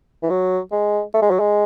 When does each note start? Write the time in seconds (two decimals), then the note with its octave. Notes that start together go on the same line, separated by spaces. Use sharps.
0.23 E3
0.30 F#3
0.72 G#3
1.14 A3
1.22 G#3
1.31 F#3
1.40 G#3